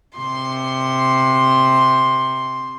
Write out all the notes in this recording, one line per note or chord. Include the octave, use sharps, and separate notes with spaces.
C3 C6